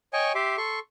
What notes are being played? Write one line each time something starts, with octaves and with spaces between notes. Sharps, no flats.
C#5 D#5 G5 G#5 C#6
G4 E5 C6 D6
A4 C6 C#6